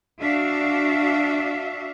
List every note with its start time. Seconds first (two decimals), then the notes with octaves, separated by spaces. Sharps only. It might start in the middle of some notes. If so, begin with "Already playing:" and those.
0.20 D4 F#4 E5 F5